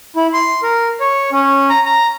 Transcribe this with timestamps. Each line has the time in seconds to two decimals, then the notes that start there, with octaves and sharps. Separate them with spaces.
0.16 E4
0.33 C6
0.63 A#4
1.00 C#5
1.32 C#4
1.70 A#5
1.86 A#5